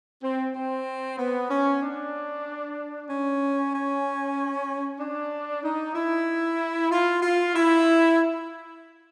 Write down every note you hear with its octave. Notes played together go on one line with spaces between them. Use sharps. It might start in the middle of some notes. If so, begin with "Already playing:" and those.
C4
C4
B3
C#4
D4
C#4
C#4
D4
D#4
E4
F4
F4
E4